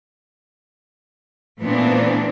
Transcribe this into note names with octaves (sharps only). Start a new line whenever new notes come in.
A#2 E3 A3 B3 C4 D4